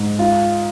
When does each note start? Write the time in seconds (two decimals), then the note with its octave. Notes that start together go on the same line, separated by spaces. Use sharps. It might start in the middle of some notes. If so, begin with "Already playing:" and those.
Already playing: G#2
0.19 F4